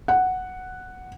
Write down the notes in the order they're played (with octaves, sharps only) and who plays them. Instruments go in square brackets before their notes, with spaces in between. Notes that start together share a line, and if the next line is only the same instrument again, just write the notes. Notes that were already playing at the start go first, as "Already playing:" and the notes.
[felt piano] F#5